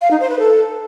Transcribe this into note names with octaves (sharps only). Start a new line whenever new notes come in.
F5
D#4
C5
B4
A4